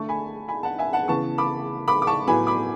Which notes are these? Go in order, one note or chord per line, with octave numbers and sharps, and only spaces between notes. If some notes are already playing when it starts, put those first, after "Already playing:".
Already playing: D3 A3 A5 C#6
G#5 B5
G#5 B5
F#5 A5
E5 G#5
F#5 A5
C#3 E3 B3 A5 C#6
B5 D6
B5 D6
D6
A5 C#6
A2 F#3 B3 G#5 B5
B5 D6